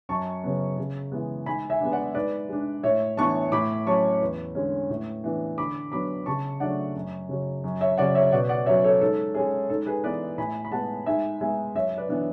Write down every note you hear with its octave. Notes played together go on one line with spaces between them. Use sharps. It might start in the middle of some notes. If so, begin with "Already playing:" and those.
F#2 A5 C#6
C#3 F#3 B3
C#3
E3 G#3 B3
G#2 G#5 B5
E5 G#5
G#3 B3 D4
D5 F#5
G#2 B4 D5
G#3 D4
A2 C#5 E5
E3 B3 D4 A5 C#6
A2 B5 D6
F#3 C#4 A5 C#6
E2
D3 G#3 C#4
A2
E3 B3 D4
D3 B5 D6
F#3 B3 D4 B5 D6
C#3 A5 C#6
F#3 A3 D4 D5 F#5
F#2
C#3 F#3
F#2
C#5 E5
C#3 F#3 C#4 D5 F#5
C#5 E5
B2 D5 F#5
D5 F#5
F#3 C#4 C#5 E5
A4 C#5
G#2 A4
G#3 C#4 G#4
G#2 A4
G#4 B4
E3 B3 B4 D5
A2 G#5 B5
B5
G#3 B3 F#5 A5
G#2 E5 G#5
G#3 B3 E5 G#5
F#2 C#5 E5
B4 D5
E3 B3 D4